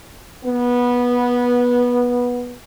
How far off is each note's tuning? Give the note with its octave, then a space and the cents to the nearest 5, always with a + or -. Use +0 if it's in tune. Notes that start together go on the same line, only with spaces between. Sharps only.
B3 -15